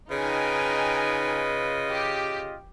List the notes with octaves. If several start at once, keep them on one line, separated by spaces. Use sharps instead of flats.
C#3 D#4 F4 B4 D#5 G5 G#5
G4